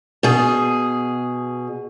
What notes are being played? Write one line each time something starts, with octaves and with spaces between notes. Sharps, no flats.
B2 G#4